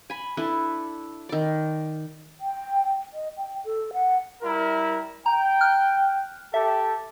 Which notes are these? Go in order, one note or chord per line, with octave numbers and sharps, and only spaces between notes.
G#5 B5
D4 E4 A4 B4
D#3 D5
G5
D#5
G5
A4
F#5
G3 E4 A#4
G5 A#5
F6 F#6
G4 A4 E5